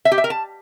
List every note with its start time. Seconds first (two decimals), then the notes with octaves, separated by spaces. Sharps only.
0.05 E5
0.12 G4
0.18 E5
0.24 A#4
0.30 A5